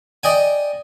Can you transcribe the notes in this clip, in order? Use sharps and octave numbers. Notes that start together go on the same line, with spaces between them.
D5 D#5 G5 G#5